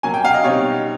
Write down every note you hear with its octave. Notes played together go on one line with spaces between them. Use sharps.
B2 F#3 A#3 C#4 G#5
G5
F5
D#5
B2 G3 C4 D#4 C#5